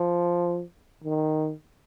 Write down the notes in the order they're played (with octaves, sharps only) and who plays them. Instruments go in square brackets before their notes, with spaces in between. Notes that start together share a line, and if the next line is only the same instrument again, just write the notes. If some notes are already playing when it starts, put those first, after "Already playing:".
Already playing: [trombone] F3
D#3